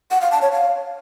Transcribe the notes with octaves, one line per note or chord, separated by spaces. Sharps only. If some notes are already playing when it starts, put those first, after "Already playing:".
F#5
F5
A5
C#5
F5